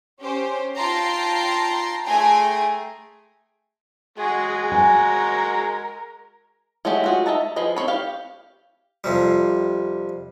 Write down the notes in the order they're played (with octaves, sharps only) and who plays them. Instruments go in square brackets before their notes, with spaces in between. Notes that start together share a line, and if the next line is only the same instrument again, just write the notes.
[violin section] C#4 G4 C5
F4 G5 A5 A#5 C6 C7
A3 G#4 G5 G#5 A#5 C6
[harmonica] G#3 F#4 [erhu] G#4
[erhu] A#4 [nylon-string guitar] G#5
[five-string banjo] F#3 G#3 A3 F#4 G4
F4 F#4 G#4
D#5 E5 A5 A#5
F3 G#4 B4 D#5
C4 B4 C#5 B5
G4 F5
[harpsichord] F2 C3 G3